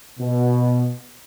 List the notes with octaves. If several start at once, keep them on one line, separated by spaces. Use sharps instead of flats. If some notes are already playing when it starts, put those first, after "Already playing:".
B2